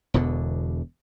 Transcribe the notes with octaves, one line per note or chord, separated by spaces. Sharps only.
E1 E2 B2 D3